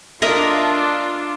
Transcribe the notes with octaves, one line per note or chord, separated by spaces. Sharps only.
D4 F4 A#4 D#5 E5